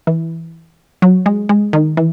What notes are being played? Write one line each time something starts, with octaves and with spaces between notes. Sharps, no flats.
E3
F#3
G#3
G#3
D#3
E3